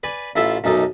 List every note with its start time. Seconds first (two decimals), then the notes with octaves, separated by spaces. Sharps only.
0.03 B4 D5 G#5 B5
0.36 A1 E4 F4 A4 E5
0.64 B1 F#2 D#4 A4 D6